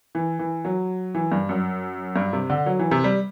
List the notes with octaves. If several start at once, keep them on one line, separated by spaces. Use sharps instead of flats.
E3
E3
F#3
E3
G2
F#2
G2
C3
D3
F#3
E3
C3
G3